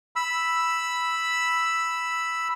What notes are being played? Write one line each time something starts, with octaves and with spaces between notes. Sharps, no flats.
B5 E6